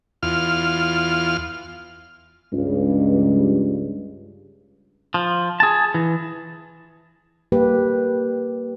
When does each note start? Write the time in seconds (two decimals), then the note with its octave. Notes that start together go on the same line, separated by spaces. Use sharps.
0.23 E2 F4 F6
2.53 C#2 G2
5.14 F3
5.60 G#4 A5
5.94 E3
7.52 G3 A#3 G4 B4